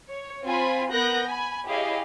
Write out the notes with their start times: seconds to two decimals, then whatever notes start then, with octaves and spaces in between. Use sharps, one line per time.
0.10 C#5
0.43 C4 F4 G#5 B5
0.91 B3 A#4 F#6 G6 A#6
1.25 G#5 B5
1.66 E4 G4 G#4 C#5 D#5 F5